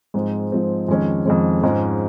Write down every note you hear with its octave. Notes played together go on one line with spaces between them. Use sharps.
G#2 F3 G#3 C4
G#2 F3 G#3 C4
F2 D#3 G#3 C#4
F2 D#3 G#3 C#4
G#2 F3 G#3 C#4